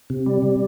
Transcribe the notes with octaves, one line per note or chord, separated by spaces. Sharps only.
C3
G3
C3